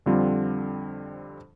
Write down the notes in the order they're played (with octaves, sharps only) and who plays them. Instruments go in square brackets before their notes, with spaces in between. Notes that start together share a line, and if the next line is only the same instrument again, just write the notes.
[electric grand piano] F2 D3 G3 C4 F4